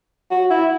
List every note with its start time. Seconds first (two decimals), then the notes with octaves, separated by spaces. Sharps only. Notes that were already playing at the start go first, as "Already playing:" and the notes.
0.31 F#4
0.50 E4